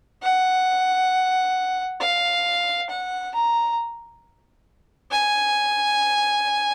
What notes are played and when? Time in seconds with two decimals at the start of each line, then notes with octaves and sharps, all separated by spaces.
0.23 F#5
2.00 F5
2.89 F#5
3.34 A#5
5.11 G#5